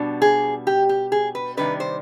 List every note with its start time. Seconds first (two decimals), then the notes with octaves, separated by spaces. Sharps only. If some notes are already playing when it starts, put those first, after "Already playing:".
Already playing: B2 G3 D4
0.22 G#4
0.67 G4
0.89 G4
1.12 G#4
1.35 B4
1.57 C3 D#3 G3 D4 B4
1.80 C5